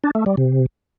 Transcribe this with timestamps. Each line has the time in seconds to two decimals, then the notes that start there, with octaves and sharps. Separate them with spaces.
0.04 D4
0.15 A3
0.26 G3
0.37 C3